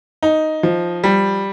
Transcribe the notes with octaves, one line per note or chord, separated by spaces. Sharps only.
D#4
F3
G3